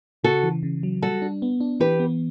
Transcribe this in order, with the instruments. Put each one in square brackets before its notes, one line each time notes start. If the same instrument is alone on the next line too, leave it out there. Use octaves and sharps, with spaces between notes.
[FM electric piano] C#3 [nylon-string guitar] F#4 A4
[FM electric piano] E3
C#3
F#3
[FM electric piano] G3 [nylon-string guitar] F#4 A4
[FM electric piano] D4
B3
D4
[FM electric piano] E3 [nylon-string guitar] G4 B4
[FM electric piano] B3